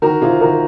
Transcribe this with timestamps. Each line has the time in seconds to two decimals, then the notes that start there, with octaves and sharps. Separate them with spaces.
0.02 D#3 F#4 A#4
0.21 C3 F4 G#4
0.41 D#3 F#4 A#4